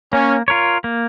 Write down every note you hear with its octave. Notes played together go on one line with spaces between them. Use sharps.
A#3 C#4
F4 A#4 C#5
A#3